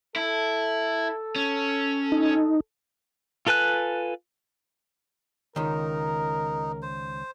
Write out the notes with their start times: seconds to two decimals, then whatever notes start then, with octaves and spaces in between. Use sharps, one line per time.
0.16 E4 A4
1.36 C#4
2.12 D#4
3.47 F4 A4 B4 G#5 F#6
5.56 C#2 D#3 D#4 A#4
6.82 C5